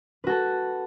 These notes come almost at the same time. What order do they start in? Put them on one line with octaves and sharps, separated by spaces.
B4 F#4 A4